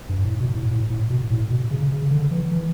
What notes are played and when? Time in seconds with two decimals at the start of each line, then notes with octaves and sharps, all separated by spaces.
0.09 G2
0.25 A2
0.40 B2
0.55 A2
0.71 A2
0.90 A2
1.10 B2
1.30 A2
1.50 B2
1.71 C#3
1.92 C#3
2.11 D3
2.31 E3
2.51 E3